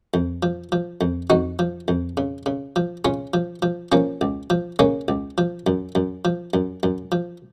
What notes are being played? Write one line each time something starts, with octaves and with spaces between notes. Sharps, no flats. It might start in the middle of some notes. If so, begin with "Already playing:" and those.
F2
F3
F3
F2
F2 D#4 F#4
F3
F2
C#3
C#3
F3
C#3 C#4 F4
F3
F3
F3 A#3 C#4
C#2
F3
C#3 A#3 C#4
C#2
F3
F#2
F#2
F3
F#2
F#2
F3